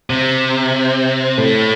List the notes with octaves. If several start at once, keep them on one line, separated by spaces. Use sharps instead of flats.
C3
A2